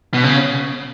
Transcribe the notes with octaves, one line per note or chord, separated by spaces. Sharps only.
B2
C#3